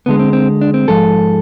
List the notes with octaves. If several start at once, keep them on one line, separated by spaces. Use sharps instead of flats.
D2 D3 G#3 B3
C4
C4
D4
C4
G#2 F3 G#3 A4